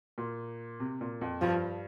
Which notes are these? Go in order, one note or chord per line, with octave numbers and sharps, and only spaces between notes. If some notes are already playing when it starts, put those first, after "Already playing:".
A#2
C3
A#2
F2
G2 F3